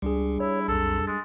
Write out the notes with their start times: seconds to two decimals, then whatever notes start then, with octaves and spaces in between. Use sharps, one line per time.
0.02 C#2 G3 D4 G#4
0.40 E4 C#5
0.68 B1 F2 A4
1.07 G#3 A6